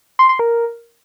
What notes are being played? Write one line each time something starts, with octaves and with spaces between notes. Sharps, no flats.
C6
C6
A#4